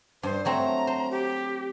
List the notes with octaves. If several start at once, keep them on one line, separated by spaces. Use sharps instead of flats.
G2 C5
F#3 A3 C4 A#5
C5
G4